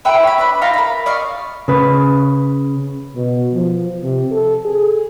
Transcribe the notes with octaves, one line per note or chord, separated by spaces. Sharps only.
B4 E5 G5 B5
C#5 B5
D4 B4 B5
D#4 F4 F5 A#5
A#4 B5
D5 D#5 F5 C#6
C#3 B4
B2
F3
C3
A4
G#4